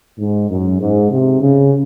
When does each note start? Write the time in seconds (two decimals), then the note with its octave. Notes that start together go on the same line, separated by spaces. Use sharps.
0.19 G#2
0.50 F#2
0.80 G#2
1.11 C3
1.41 C#3